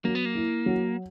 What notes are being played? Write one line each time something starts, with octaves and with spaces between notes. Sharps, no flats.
F#3 A#3
B3
A#3
E4
F#3